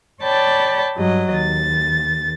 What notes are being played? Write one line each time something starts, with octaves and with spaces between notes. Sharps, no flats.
C#5 D5 G5 A5 B5
G2 F#3 D#5
D#2 A6